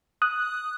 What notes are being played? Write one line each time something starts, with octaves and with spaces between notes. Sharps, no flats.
D#6 F#6